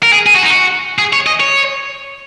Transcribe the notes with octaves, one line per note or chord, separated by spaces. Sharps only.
A#4
G#4
G#4
F#4
D#4
F#4
G#4
C#5
D#5
C#5